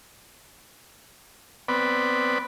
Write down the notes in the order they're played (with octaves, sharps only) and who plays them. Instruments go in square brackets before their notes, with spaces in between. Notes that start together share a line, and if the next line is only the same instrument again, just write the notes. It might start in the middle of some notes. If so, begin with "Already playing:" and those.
[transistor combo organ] B3 C4 B4 D5